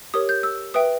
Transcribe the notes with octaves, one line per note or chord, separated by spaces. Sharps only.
G4 A#4 C#5 D#6
G6
E6
B4 E5 G5 D#6